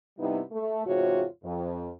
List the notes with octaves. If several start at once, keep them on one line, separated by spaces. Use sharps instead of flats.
G2 C3 G3 B3 D#4 E4
A3
E2 G#2 C3 F4 F#4 C#5
F2